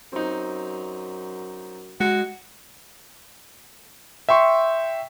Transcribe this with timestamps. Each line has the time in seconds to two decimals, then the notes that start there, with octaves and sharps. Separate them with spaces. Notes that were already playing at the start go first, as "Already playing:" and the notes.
0.12 F#2 C4 D#4
2.00 G#3 F#4
4.29 E5 G5 C6 C#6